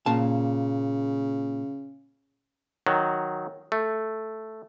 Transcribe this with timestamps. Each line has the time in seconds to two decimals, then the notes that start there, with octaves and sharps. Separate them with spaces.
0.06 A#2 C#3 F5 A5
2.87 D#3 F#3
3.72 A3